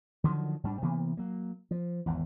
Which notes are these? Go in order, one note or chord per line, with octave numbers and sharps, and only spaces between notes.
D3 D#3 F3 F#3
G#2 G3 D4
C3 E3 A#3 B3
F#3 A#3
F3
G#1 E2